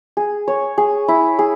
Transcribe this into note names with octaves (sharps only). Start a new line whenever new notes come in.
G#4
C#5
G#4
E4
G#4